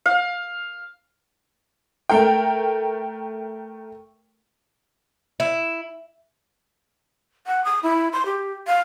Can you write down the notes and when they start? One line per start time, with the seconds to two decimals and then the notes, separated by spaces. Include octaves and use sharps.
0.06 F5
2.09 A3 A#4 G5
5.40 E4
7.47 F#5
7.64 D#6
7.83 E4
8.13 C6
8.26 G4
8.67 F5